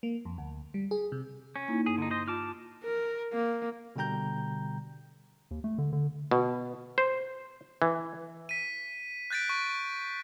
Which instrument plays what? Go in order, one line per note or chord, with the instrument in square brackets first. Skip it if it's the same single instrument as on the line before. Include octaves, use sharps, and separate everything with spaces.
[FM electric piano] A#3
F2
D2
G3
G#4
C3
[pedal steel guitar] C#4
[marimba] A#3 D#4 E4
[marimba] G2 [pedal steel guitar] G#4
[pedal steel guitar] D3 D#4
C5 D#5
[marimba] F4 [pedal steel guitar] A5 D6 F6
[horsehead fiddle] A#4
A#3
[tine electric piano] B2 D3 G3 G5 A#5 G6
[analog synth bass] D#2
A3
D3
D3
[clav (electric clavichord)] B2
C5
E3
[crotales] B6 D#7
F#6 G6 A6 B6 D7
C#6